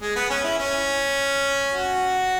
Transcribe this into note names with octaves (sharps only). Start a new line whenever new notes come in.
G#3
B3
C#4
E4
C#4
F#4